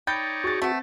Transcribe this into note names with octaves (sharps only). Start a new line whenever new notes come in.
D#4 C#5 D5 G5 B5 G6 A6
F#4 G#4 A6
A3 B3 C4